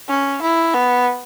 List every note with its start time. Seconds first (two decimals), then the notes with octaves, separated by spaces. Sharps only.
0.08 C#4
0.42 E4
0.74 B3